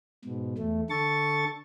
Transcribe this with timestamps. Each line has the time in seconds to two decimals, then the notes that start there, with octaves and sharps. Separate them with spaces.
0.25 G#2 B2
0.58 E2 A3
0.90 D3 A4 C#6 A6